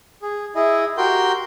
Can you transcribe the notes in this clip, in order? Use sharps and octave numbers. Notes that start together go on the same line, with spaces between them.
G#4
E4 G#4 D#5
F#4 G4 A#4 G5 C6 G6